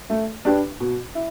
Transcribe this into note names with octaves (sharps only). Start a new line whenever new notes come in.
A3
D4 G4 B4
B2
E4